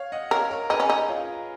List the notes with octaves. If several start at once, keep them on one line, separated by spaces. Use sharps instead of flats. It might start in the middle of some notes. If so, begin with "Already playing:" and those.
Already playing: C#5 F5
D#5 F#5
A#4 C#5 F5
A#4 C#5
D#4 G#4 B4
C#4
D#4
C#4 F4